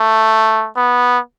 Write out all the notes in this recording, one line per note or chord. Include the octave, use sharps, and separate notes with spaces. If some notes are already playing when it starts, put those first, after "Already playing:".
Already playing: A3
B3